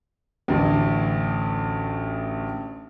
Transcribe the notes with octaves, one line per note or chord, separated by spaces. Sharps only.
A1 D2